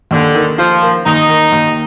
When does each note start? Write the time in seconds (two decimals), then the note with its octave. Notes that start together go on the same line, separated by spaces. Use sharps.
0.11 D#2 D3
0.35 D#3
0.58 F3 F4
0.82 A#3
1.06 D#2 D#4
1.29 D#3
1.52 D#2